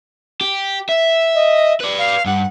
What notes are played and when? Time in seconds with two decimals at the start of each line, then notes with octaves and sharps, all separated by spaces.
0.41 G4
0.89 E5
1.34 D#5
1.81 B4 D5
1.97 F5
2.26 G2 F#5